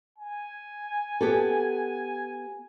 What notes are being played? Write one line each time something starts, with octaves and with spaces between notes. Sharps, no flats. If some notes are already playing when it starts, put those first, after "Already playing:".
G#5
B3 G4 A4